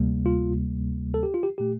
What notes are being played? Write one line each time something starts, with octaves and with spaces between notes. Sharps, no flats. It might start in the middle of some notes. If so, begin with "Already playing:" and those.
Already playing: D2 C3 G3 A#3
F4
A4
G4
F4
G4
A#2 A3 G4